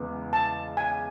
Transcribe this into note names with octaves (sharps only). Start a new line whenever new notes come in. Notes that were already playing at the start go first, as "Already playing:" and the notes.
Already playing: E2 C#3 E3 G#3 B3
A5
G#5